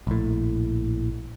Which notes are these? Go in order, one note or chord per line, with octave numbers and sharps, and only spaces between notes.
A#1 A2